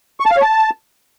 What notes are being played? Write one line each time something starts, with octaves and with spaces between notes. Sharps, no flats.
C#6
A5
F5
C#5
A5